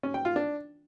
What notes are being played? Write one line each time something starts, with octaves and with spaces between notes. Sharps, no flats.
C#4
G5
F4
D4